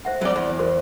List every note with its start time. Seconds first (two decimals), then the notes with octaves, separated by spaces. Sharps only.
0.05 C5 E5 F#5
0.21 F#3 D5
0.36 E2
0.59 F#4 A#4 C5